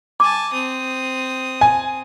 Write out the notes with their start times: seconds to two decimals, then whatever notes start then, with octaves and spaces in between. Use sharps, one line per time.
0.20 G#5 A5 D6
0.53 C4 D#6
1.61 G#5